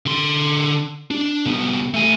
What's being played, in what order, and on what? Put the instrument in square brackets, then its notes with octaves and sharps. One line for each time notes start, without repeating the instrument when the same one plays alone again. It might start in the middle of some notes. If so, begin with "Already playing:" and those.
[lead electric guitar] D3 C6
D4
C2 B3
A3 G#5